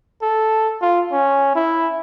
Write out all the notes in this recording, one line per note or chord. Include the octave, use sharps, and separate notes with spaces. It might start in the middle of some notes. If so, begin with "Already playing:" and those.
A4
F4
C#4
E4